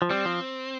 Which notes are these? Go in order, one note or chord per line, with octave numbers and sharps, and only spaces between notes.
F3
G3 C4
F3